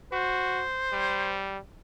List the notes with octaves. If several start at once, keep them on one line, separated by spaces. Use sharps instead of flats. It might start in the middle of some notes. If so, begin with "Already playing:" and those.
F#4 C5
G3